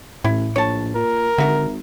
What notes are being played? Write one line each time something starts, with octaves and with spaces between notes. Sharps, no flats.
A1 A2 E4
A#1 C#5 A5
A#2 A#4
G#1 D3 F#4 E5